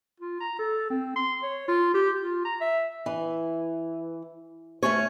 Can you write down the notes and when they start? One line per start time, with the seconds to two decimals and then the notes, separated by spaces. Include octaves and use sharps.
0.20 F4
0.40 A#5
0.59 A4
0.90 C4
1.16 C6
1.43 C#5
1.68 F4
1.94 G4
2.21 F4
2.45 A#5
2.61 E5
3.06 E3
4.83 A3 C#4 C#5